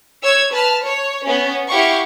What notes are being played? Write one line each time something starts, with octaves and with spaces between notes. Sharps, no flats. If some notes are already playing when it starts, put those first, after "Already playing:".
C#5 E6 G#6
B4 A5 F6
C#5
B3 C#4
E4 G4 F5 F#5 C#6